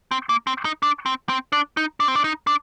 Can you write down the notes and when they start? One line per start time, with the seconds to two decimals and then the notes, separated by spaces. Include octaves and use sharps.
0.11 C4
0.29 A#3
0.47 C4
0.65 D#4
0.83 D4
1.06 C4
1.29 C4
1.52 D4
1.77 D#4
2.00 D4
2.08 C4
2.15 D4
2.24 D#4
2.47 D4